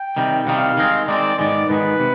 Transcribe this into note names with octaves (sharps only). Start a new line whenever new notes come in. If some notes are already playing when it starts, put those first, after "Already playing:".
Already playing: G5
C3 D#3 G3
C3 D#3 G3 F5
D#3 G#3 C4
D#3 G#3 C4 D5
G#2 D#3 G#3 B3 D5
G#2 D#3 G#3 B3 B4
C3